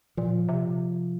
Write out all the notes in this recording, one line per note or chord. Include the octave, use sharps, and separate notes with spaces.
A#2 F3
C3